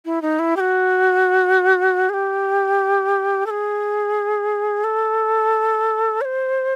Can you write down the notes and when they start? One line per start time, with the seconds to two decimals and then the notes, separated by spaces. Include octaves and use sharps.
0.05 E4
0.22 D#4
0.39 E4
0.56 G4
0.60 F#4
2.09 G#4
2.14 G4
3.46 A4
3.50 G#4
4.84 A4
6.21 C#5
6.25 C5